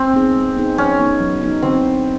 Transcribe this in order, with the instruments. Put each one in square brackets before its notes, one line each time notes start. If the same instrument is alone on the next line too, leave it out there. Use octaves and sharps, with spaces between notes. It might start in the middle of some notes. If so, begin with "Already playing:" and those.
Already playing: [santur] C4
[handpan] B3 D#4 G#4
G#3
B3 D#4 G#4
[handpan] F#3 [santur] C#4
[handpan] B3 D#4
F#3
B3 D#4
[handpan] D3 [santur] C4